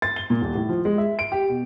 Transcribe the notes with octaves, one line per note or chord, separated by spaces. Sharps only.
A6
G7
A#2
D#1
A2
F3
G#3
E5
D7
G4
B2